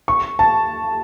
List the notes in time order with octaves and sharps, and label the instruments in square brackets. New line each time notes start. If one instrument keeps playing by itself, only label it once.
[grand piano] C#6
A5